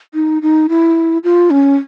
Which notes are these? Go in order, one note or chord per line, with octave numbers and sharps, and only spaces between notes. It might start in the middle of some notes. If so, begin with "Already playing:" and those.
D#4
D#4
E4
F4
C#4